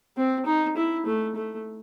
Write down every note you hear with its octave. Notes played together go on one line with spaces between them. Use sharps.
C4
D#4
E4
A3
A3